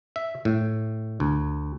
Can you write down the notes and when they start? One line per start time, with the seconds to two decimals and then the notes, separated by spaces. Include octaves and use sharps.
0.16 E5
0.45 A2
1.20 D2